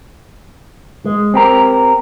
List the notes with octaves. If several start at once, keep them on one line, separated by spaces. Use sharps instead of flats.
G#3
C4 G4 A#4